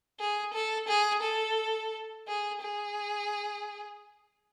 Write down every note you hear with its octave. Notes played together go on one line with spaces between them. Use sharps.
G#4
A4
G#4
A4
G#4
G#4